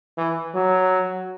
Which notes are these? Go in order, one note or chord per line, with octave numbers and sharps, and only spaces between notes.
E3
F#3